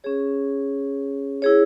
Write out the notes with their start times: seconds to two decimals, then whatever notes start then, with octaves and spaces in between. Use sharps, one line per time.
0.04 C#4 G#4 C#5
1.42 E4 G#4 C#5